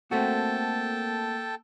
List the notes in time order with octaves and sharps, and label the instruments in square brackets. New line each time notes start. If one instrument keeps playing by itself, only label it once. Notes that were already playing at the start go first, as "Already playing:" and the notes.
[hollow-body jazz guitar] A3 C4 F#4 [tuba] A#3 [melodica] A4 G5 A5